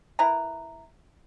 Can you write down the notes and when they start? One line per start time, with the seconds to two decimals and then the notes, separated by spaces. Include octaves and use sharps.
0.19 E4 A#4 B4 A#5